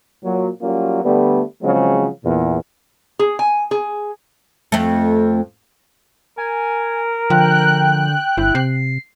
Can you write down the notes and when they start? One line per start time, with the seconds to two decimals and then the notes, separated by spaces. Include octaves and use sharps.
0.24 A#2 F#3
0.61 F#3 G3 A#3 C#4 F4
1.03 D3 G3 A3 B3
1.62 C#3 F3 F#3 G#3 C4
2.24 E2 A#2
3.19 G#4
3.39 G#5
3.71 G#4
4.72 F2 A3
6.38 A#4 G#5
7.30 D3 F3 G5 F#6
8.37 G1 E4
8.55 C3 C7